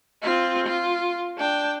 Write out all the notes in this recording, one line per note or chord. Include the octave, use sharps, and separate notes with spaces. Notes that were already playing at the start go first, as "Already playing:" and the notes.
C4 F4
F4
D4 G5